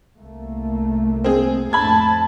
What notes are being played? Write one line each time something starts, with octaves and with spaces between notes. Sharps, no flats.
C2 A3 A#3
C4 G#4
F2 A2 A3 A5 B5 G#6